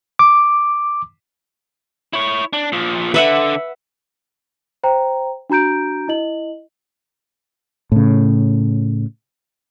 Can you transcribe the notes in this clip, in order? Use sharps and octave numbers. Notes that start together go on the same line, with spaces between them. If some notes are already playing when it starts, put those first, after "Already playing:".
D6
E4 C#5
D4
A#2 F3
D3 B4 E5 F#5
C5 G5 A#5
D4 F#4 A#5 G6 D7
E4 D#5 F#7
A2 C#3